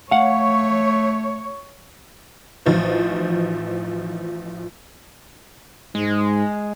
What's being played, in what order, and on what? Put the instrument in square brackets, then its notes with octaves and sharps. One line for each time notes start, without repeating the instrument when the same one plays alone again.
[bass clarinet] A3 [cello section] C#5 [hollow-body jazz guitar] F5 F#5
[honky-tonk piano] A1 F3 D#4 F#4 C5
[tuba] G#2 [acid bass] G#3